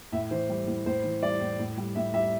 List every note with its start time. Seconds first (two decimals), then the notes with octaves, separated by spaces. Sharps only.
0.12 A2 E5
0.31 E3 C5
0.49 G3
0.67 A2
0.86 A2 C5
1.04 E3
1.22 G3 D5
1.41 A2
1.59 A2
1.78 G3
1.95 A2 E5
2.14 G3 E5